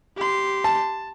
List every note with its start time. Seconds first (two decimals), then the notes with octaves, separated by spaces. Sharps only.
0.16 G4 C6
0.64 A5